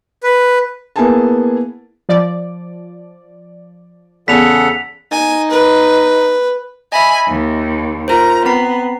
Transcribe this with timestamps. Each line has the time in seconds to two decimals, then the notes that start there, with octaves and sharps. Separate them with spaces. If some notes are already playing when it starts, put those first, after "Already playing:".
0.23 B4
0.96 A#3 B3 E4 G#4 G#5 A5
2.09 F3 D5
4.28 E2 C#3 A4 F#5 B6 F7
5.11 D#4 G#5
5.51 B4
6.92 D#5 E5 G#5 B5
7.28 D#2
8.08 F4 A#4 C5 A#5
8.46 B3 C4 A#5 C7